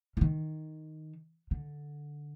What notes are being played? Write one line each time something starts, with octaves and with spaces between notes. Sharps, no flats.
E3
D#3
D3